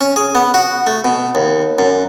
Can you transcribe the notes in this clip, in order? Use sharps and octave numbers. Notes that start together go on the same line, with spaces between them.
C#4
G#4
B3
F#4
A3
B2
D#2
F#2